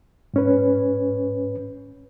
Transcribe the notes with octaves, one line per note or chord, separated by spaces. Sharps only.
G#2 C#4 B4